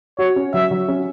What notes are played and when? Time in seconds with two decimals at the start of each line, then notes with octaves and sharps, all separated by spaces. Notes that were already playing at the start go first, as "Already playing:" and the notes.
0.19 F#4 C#5
0.36 C#4
0.54 F#3 E5
0.71 F#3
0.88 C#4